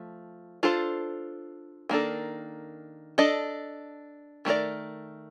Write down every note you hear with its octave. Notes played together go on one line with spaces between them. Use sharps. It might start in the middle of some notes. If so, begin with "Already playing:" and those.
Already playing: F3 A3
D4 F4 A4 C5
D#3 A#3 D4 A4
D4 A4 D#5
D#3 A3 D#4 A#4 D5